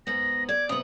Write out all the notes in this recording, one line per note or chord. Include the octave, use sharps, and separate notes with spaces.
G#2 B3 A#6
D5 G#6
C3 B3 D#6